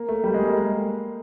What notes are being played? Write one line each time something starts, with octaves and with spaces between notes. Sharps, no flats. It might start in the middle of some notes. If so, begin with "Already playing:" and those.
Already playing: A#3
A3
G3
G#3
A#3